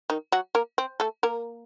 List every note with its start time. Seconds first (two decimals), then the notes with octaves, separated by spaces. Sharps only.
0.10 D#3 D#4
0.32 F#3 F#4
0.55 A#3 A#4
0.78 C4
1.00 A3 A4
1.23 A#3 A#4